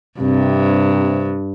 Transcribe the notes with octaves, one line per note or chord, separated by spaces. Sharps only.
G2 C3